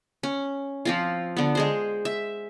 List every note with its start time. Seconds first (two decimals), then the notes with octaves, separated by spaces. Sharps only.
0.23 C#4
0.85 F3 C4 F4
1.37 D3 B3
1.55 G#3 G#4 C5
2.05 E5